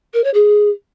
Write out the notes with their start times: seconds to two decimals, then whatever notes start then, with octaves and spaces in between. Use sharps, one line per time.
0.14 A#4
0.24 C#5
0.34 G#4